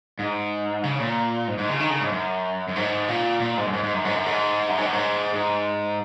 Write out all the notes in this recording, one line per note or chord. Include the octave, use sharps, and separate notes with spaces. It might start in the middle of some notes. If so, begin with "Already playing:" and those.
G#2
C#3
A#2
G#2
G#2
C#3
D#3
C#3
G#2
F#2
F#2
G#2
A#2
A#2
G#2
F#2
G#2
G#2
F#2
G#2
F#2
G#2
F#2
G#2
F#2
G#2
G#2